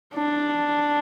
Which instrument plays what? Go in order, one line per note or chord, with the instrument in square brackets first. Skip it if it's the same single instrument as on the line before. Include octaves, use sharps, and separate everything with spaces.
[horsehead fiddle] D4